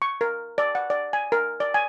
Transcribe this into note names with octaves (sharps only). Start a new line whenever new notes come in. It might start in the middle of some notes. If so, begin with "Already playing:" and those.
C#6
A#4
D5
F#5
D5
G#5
A#4
D5
G#5